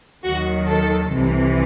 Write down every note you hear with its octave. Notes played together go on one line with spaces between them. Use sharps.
D#2 D#3 F#3 F#4
A4
C2 C3 E3